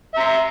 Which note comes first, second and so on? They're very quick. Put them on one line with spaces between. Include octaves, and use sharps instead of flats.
E5 A#5 C6